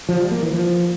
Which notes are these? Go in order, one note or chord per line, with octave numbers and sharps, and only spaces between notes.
F3
G3
A#3
E3
F3